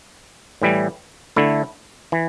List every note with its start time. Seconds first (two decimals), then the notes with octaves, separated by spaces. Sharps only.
0.62 A2 E3 G3
1.36 D3 A3 E4
2.12 E3